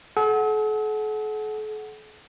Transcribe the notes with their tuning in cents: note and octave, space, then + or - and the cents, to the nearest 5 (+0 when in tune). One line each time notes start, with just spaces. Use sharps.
A4 -45 F#5 +0